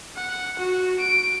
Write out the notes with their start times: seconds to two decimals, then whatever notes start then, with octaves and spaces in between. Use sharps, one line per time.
0.16 F#5
0.59 F#4
1.00 D7